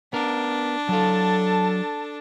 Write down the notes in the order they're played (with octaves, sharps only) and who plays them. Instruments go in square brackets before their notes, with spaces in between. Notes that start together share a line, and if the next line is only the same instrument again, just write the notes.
[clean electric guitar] B3 A#4 [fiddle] D4
[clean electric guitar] F#3 F5 [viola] A4 A5